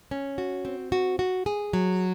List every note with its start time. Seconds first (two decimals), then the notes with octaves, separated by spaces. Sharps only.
0.11 C#4
0.38 F#4
0.65 C4
0.92 F#4
1.19 F#4
1.46 G#4
1.73 F#3